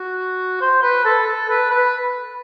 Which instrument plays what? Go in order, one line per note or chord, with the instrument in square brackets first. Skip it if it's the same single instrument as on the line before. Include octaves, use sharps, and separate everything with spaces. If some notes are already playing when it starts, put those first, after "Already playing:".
Already playing: [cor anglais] F#4
C5
B4
A4
A4
B4
B4